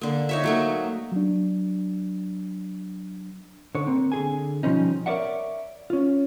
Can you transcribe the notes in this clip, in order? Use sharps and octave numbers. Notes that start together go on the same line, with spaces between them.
D3 A#3
D#4 C#5 E5
F#3 A3 A#3
F#3 D4
D3 C#5
A#3 C4
D3 G#4 G#5
B2 F3 G3 C#4 D#4
A#4 C#5 D5 E5 F#5
C#4 F4